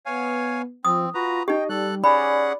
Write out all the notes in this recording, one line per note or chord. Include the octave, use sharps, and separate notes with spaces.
B3 C#5 F5 G#5
F3 C4 D#6
F4 F#4 B4 A#5
D#4 G4 D#5 G5
G3 A4 F#6
C#4 G#4 D5 F#5 B5